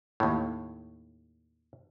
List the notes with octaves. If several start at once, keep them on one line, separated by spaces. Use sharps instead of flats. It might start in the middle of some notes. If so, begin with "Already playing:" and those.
D#2 A2